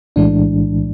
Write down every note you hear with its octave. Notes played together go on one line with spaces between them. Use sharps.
B1 A2 E3 G#3 D4